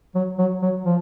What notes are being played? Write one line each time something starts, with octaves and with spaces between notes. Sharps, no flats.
F#3
F#3
F#3
F3